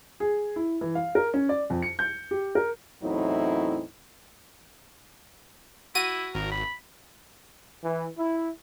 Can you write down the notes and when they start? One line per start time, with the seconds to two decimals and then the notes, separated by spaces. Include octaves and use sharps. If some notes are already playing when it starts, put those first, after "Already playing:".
0.20 G#4
0.56 E4
0.81 E3
0.95 F5
1.15 A#4
1.34 C#4
1.49 D5
1.70 F2
1.82 C#7
1.99 G6
2.31 G4
2.55 A#4
3.02 E2 A2 F#3 C4 D#4 E4
5.95 E4 F#4 D#7
6.35 G#1 A#4
6.52 B5
7.84 E3
8.18 E4